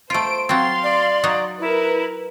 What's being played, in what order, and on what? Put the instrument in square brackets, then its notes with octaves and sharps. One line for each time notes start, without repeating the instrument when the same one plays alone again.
[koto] A3 F4 [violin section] C5 D7
[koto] F#3 C4 [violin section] F5 C6 [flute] A6
[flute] D5
[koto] F#3 D#4
[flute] E4 [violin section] A#4 B4